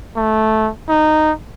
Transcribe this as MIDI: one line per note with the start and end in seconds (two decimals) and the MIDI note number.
0.16 0.69 57
0.89 1.32 63